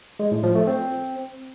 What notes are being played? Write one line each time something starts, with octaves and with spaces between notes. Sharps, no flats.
G#3
A2
F3
A3
C4